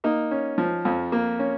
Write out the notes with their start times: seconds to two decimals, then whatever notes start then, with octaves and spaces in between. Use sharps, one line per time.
0.04 A#3 D#4
0.31 C#4
0.58 F3
0.85 F2
1.12 A#3
1.39 C#4